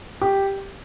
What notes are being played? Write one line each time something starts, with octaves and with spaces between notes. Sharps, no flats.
G4